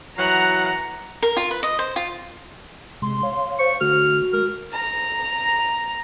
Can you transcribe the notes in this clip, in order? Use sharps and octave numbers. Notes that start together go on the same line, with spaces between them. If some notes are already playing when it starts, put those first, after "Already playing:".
E3 F#3 F#5 A#5
A#4
F4
B4
D#5
C5
F4
C3 G#3 C6
C#5 F5
C5 C#6
D3 A3 F#4 F6
G#3 A#4
A#5